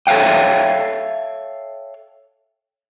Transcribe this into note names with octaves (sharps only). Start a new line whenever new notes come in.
A4 C#5 E5 F5 G5